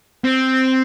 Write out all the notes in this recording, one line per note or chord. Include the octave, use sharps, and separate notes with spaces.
C4